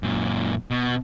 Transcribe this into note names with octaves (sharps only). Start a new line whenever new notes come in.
F#2 A#2
B2